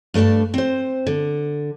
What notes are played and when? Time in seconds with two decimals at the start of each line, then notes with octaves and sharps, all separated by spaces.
0.14 G2 A3 D4 D5 A5
0.54 C4 C5
1.07 D3